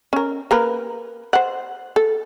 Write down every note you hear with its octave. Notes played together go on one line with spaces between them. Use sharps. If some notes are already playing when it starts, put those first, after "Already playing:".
C#4 A#4
A#3 A#4 B4
C5 F#5
A4